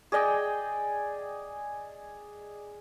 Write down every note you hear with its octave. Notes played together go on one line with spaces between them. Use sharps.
G#4 D5 D#5 G5